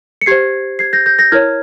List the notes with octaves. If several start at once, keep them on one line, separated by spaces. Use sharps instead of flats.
C#7
G4 C5 G#6 C7
G#6 C7
G6 A#6
G6 A#6
G6 A#6
E4 A#4 C#5 F6 G#6